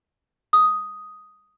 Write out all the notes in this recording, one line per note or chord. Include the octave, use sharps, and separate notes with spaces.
D#6